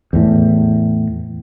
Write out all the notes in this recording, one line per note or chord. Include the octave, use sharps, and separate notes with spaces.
E2 A2